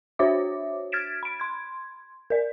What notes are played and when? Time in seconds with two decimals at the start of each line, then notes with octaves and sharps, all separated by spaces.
0.19 D4 F#4 C5 C#5 E5 D6
0.92 F6 G#6 A6 B6 D7 E7
1.23 B5 D7
1.40 C6 G#6
2.30 A#4 D5